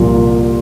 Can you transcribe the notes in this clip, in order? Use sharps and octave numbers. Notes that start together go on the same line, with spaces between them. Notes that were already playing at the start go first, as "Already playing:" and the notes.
Already playing: C2 A#2 F3 A#3